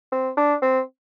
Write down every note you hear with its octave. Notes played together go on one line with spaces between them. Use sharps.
C4
D4
C4